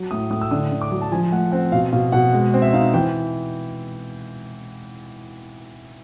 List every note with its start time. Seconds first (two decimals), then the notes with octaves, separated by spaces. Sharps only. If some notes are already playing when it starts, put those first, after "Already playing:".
Already playing: F#3
0.11 A2 D#6
0.30 A2 D#6
0.41 E6
0.51 D3 D#6
0.71 D3
0.81 D6
0.92 F#3
1.02 A5
1.12 F3 G#5
1.32 A3 F#5
1.52 C4 F#5
1.72 B2 F5
1.92 B2 F5
2.12 B2 F#5
2.33 G#3
2.54 C4
2.62 E5
2.73 D#4 F5
2.94 E3 G5